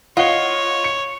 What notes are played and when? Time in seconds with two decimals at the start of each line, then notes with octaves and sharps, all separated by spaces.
0.17 F4 C#5 D#5 F#5 G7
0.84 C#7